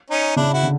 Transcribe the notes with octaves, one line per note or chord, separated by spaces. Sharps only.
C#4 D#4
C#3 D4 E4
E4 F#4
D3